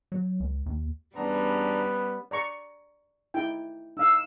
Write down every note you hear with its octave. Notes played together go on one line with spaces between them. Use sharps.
F#3
C#2
D#2
E2 G3 B3 C#4 D4 A#5
D5 A#5 C#6
D#4 E4 G5
D#4 F5 E6